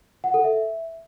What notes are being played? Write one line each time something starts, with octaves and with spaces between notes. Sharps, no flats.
F#5
A4
E5